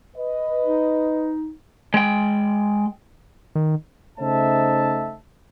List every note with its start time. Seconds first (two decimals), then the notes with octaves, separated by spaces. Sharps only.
0.16 B4 D#5
0.64 D#4
1.94 G#3 G5
3.55 D#3
4.18 C#3 A3 D#4 C5 E5 A5